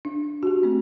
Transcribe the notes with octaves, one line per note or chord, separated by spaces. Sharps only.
D4
F#4 G4
A3 C4 F#4